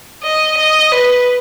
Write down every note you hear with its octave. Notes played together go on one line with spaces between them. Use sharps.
D#5
D#5
B4